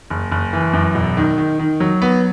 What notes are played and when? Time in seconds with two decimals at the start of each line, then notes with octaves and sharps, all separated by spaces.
0.10 F#1
0.31 F#1
0.53 E3
0.73 F#2
0.95 E1
1.17 D#3
1.38 D#3
1.59 D#3
1.80 F#3
2.02 B3